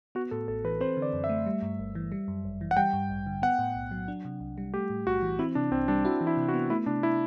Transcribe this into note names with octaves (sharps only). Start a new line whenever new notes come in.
B3 F#4
A2 A4
A1 A4
E3 B4
C4 C5
D3
D5
F#2
E5
A3
G3
G2
G1
E3
G3
F#2
G1
E3
F#5
G3 G5
G2
A1
D3
B3 F#5
A2
B1
F#3
D4
C3
C2
G3
A3 G4
A2
B1 F#4
E3
C4 E4
C3 D4
C2 C4
G3 D4
E4 F#4
E3
E4
C3
F#4
B3
A3 E4
C3 D4
E4